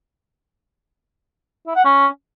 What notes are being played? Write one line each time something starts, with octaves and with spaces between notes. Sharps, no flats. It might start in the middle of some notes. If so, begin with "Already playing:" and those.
E4
F#5
C#4